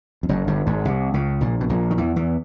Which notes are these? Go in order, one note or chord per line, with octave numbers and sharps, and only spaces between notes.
F2
F#1 F#2
G1 G2
G#1 G#2
C2 C3
C#2 C#3
A#1 A#2
B2
A#1 A#2
D#3
E2 E3
E2 E3